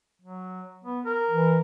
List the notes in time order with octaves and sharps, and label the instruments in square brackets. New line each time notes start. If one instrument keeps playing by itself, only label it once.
[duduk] F#3
B3
A#4
[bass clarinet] E3